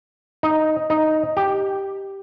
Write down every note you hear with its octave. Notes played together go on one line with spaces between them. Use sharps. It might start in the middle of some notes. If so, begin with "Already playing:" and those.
D#4
D#4
G4